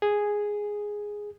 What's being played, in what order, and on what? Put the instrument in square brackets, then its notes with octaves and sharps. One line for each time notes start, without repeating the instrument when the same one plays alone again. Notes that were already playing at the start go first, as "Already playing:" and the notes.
[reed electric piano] G#4